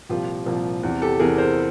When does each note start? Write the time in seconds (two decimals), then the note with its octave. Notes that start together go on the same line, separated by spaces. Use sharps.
0.09 C2 A#2 F3 F4 G4
0.46 C2 A#2 F3
0.83 E2 C3 E3
1.02 G4 A4
1.20 E2 C3 E3 G#4 A#4
1.38 A#4 C5